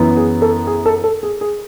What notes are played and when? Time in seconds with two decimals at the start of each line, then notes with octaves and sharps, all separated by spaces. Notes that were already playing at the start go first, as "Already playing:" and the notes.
Already playing: F#2 E3 B3
0.17 G#4
0.42 A4
0.67 G#4
0.86 A4
1.04 A4
1.23 G#4
1.41 G#4